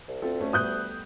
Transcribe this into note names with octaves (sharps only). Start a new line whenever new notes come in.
C2
D2 C4 F4 A4
A3 C#4
G3 A3 B3 D#6 F#6 G6